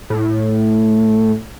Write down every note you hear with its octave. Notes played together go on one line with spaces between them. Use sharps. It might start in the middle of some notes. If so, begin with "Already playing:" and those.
A2